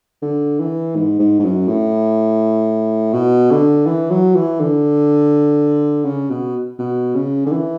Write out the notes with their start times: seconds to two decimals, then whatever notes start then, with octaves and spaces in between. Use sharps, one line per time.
0.22 D3
0.60 E3
0.96 G#2
1.19 G#2
1.39 G#2
1.44 F#2
1.68 A2
3.14 B2
3.51 D3
3.86 E3
4.11 F#3
4.35 E3
4.60 D3
6.05 C#3
6.30 B2
6.79 B2
7.15 C#3
7.46 D3
7.52 E3